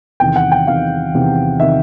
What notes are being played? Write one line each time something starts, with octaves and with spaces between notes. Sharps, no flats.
E2 C3 D#3 G5
F#5
G5
E2 C3 D#3 F5
E2 C3 D#3
C3 D#3 E5